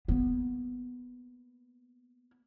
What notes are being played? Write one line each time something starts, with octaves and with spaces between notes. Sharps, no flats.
A#3 B3